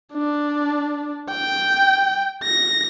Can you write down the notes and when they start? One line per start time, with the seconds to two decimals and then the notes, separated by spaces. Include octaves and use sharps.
0.13 D4
1.31 G5
2.44 A#6